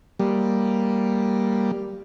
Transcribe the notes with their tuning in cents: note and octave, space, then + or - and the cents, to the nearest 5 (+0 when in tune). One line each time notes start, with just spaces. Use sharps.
G3 +0 A#3 +0